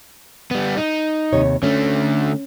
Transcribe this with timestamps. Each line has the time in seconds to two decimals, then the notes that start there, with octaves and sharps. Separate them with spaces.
0.51 G3 B3
0.77 D#4
1.33 D#2 C3 C#5
1.63 D3 A3 C#4